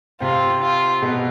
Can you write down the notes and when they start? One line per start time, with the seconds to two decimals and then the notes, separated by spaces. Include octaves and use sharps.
0.21 C3 C4 F4
0.62 F4
1.02 B2 B3